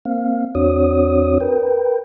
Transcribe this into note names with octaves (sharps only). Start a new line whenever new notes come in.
A#3 C4 F5
E2 C4 D4 F#4 C#5 D#6
A#4 B4 G5